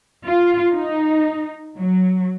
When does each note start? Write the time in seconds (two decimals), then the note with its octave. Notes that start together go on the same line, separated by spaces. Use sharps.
0.28 F4
0.73 D#4
1.79 F#3